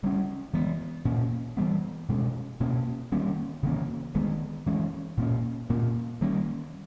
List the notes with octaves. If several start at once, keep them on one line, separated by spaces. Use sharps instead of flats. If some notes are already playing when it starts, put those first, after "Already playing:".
C#3 G3 C#4
E3 G#3 B3
A#2 A#3 C#4
E3 G3 B3
B2 G#3 C#4
B2 A#3 C#4
D#3 G3 A#3 C#4
C#3 E3 A#3 C#4
D#3 G#3 B3
E3 G#3 C#4
A#2 A#3 C#4
A#2 A#3 C#4
D#3 G3 A#3 C#4